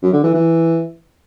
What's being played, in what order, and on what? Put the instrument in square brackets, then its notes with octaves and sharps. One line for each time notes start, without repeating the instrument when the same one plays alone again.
[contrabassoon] F#2
D3
E3
E3